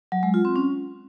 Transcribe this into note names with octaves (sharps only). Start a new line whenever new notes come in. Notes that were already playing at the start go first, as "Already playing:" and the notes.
F#3
G#3
F4
C4
C#4